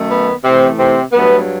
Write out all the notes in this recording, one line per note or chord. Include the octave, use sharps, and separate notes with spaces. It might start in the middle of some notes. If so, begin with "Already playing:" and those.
Already playing: F#2 D#3 A3
B3
A2 C3 E3 A3 C4
C3 C4
G2 F#3 A3 B3